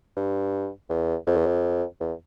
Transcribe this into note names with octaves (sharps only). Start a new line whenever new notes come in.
G2
E2
F2
E2
F2
E2